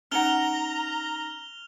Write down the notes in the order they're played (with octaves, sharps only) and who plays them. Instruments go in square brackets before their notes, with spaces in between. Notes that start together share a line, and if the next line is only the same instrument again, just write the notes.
[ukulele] C#4 D#4 F#5 [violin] A#5 [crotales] F6 F7 G7